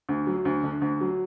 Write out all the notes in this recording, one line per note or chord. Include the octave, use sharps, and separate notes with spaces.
D2
F#3
D2
D3
D2
F#3